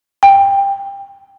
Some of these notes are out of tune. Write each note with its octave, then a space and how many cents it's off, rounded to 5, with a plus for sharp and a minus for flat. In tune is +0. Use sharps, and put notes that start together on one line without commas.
G5 +20